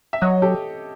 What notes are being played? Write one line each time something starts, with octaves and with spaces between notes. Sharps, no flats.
E5
F#3 C#5 D#5
G4 A4